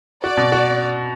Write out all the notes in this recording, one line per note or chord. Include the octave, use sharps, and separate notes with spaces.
F#4 D5
B2
F#4